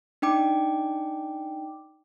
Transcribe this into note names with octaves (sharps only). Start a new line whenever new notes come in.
D4 D#4 G5 D6